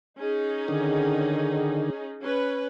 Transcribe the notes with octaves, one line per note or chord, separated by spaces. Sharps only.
C#4 D#4 G#4
D3 D#3
C#4 B4